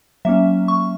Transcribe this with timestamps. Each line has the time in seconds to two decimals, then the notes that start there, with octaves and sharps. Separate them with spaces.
0.25 F#3 A#3 C#4 E5
0.68 C#6